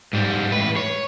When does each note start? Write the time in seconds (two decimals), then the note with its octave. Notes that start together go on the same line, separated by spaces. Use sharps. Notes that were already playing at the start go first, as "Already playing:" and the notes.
0.13 G#2 G3
0.52 A2 B4
0.76 C#5